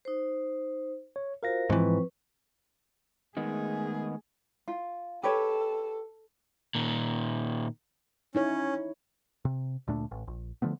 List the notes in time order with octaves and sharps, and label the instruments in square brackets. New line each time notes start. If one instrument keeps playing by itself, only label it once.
[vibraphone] D#4 C5
[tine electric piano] C#5
[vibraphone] F4 F#4 C5 [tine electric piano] A#4 F5 A#6
[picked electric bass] G#2 E3 [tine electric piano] F3 C4 [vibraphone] B4 C#6
[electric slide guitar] D#3 G#3 B3 [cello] A3 G#4
[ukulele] F4
[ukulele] G4 B4 C#5 [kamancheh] A4
[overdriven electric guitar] A#2 D#3
[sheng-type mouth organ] C#4 [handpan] D#4 E4 C#5
[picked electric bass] C3
D2 A#2 A3 D4
A1
A#1
D3 F3 A3 B3